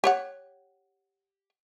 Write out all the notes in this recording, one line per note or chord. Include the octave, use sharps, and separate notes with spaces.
G4 C#5 F#5